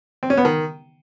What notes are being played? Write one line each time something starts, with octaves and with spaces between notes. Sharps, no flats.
C4
C#4
B3
D#3